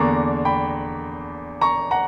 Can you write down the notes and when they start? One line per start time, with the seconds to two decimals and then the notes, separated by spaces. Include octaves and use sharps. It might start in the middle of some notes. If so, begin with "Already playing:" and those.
Already playing: E2 D3 A#3 D4 A#5 C#6
0.45 G5 B5
1.61 A#5 C#6
1.91 F#5 A#5